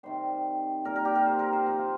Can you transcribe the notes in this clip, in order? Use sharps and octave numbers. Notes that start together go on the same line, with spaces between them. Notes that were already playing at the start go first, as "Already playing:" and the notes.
C3 D#3 G3 C5
A#2 G3 A#4
A#4
G4
A#4
C5
A#4
C5
C3 F3 C4
F4